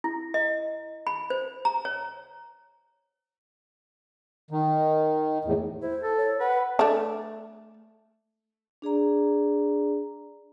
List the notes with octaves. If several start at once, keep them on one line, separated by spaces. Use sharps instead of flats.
E4
D#5
B5
C5
A#5
C#5
D#3
E2 A2
E4 C5
A4
C#5
B4 F#5
A3 D4
D4 G#4 D5 A#5